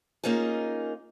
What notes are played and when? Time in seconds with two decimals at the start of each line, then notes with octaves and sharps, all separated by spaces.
0.24 A#3 C#4 D#4 F4 G#4